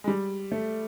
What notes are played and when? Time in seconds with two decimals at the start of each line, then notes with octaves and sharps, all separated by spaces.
0.04 G#3
0.07 G3
0.52 A3